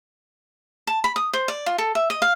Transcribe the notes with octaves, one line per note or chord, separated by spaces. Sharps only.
A5
B5
D#6
C5
D5
F4
A4
E5
D#5
F5